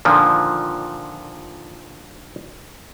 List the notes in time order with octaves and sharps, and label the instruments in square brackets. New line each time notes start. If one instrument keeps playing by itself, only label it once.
[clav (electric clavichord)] A#2 D3 D#3 F3